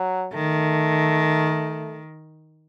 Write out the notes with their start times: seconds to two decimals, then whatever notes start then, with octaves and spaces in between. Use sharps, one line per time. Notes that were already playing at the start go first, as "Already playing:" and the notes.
Already playing: F#3
0.33 D#3 A3